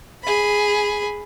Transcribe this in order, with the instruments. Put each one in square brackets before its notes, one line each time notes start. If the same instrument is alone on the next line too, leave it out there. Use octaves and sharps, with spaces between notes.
[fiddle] G#4 B5